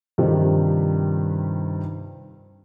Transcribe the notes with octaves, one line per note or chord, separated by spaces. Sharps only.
G2 C3 D#3 F3 G3